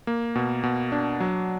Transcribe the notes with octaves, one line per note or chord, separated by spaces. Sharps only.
A#3
B2
B2
D4
F#3